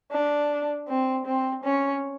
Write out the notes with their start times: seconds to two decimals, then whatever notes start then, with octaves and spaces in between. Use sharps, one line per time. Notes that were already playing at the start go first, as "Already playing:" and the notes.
0.12 D4
0.88 C4
1.26 C4
1.64 C#4